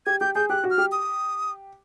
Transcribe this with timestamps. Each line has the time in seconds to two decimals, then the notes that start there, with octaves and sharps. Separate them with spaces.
0.06 G4 G#6
0.21 G4 G6
0.35 G#4 G6
0.50 G4 F#6
0.64 F#4
0.71 F6
0.78 G4
0.92 D#6